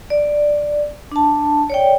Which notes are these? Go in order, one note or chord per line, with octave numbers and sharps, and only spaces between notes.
D5
D4 A5
C#5 D5 G5